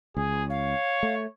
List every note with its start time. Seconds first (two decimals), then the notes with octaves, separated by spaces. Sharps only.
0.17 C#2 G#4
0.50 C#5 F5
1.03 A3